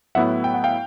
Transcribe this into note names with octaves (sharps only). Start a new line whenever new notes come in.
A2 F#3 B3 E4 E5 F#5
G5
F#5
F5 G5